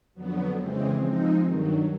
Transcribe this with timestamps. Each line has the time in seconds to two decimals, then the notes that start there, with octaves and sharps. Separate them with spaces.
0.14 F2 D3 F#3 B3
0.57 F2 C#3 E3 G#3 C4
0.99 F3 G#3 C4 D#4
1.42 G2 D#3 F#3